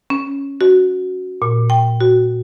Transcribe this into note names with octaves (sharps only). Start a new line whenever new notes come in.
C#4
F#4
A#2
G5
F#4